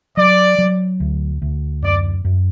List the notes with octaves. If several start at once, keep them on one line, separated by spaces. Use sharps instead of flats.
F#3 D5
F#3
D2
D2
F#2 D5
F#2